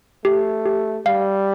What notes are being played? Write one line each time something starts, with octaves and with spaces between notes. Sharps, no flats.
A3 G4
G4
G3 F5